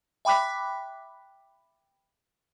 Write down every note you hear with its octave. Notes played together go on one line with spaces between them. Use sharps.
E5 G5 B5 D6 F#6 B6